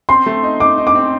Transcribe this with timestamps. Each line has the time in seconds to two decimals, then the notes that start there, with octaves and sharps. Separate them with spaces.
0.09 C4 C6
0.26 A3
0.43 D#4
0.60 D#4 D6
0.78 D#4
0.87 D6
0.95 C4